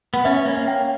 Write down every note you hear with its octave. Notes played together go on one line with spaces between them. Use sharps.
B3
C#4 E5
A#3 C#5
G5